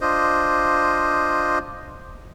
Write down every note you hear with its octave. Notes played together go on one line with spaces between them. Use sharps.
D4 F4 C5 D#5